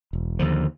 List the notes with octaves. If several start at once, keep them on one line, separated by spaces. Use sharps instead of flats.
E1
D#2 D3 F3